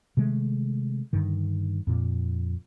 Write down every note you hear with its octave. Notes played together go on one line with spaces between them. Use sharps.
C3 D#3 G#3 A3
G2 D3 D#3
F2 A#2